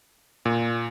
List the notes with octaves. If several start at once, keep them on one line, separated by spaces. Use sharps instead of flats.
A#2